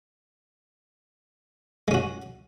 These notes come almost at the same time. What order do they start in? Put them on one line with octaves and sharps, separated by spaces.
G#3 C#4 F#4